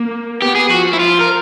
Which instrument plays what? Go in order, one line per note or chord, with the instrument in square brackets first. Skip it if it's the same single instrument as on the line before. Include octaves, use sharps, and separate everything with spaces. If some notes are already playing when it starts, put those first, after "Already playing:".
Already playing: [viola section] A#3
[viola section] B3 [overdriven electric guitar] G4
[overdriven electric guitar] G#4
[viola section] F3 [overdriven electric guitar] F#4
[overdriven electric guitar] E4
F4
A#4